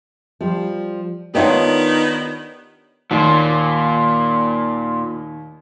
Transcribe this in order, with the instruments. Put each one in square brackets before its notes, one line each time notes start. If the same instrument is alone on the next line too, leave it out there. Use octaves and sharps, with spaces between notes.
[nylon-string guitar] F3 G3
[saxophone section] D#3 B3 [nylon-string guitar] D4 D#4 F4 [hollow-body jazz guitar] G4 C#5 F#5
[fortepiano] D#2 [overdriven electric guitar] A#2